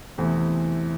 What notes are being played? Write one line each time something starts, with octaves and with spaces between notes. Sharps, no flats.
E2 C3 E3 A3 C4